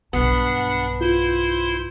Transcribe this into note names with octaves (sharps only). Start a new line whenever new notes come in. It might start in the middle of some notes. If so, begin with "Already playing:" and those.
B1 G2 B3 D4 F#5
E4 F4 C5 C6